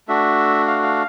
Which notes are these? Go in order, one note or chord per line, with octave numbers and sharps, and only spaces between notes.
A3 D4 F#4 E5
F5
F5